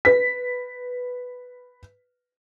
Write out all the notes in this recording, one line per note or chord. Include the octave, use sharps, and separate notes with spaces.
B4 B6